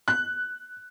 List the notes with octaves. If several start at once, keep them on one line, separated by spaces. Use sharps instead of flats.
F#6